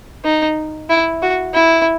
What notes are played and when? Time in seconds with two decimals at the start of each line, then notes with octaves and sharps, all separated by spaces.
0.24 D#4
0.90 E4
1.22 F#4
1.54 E4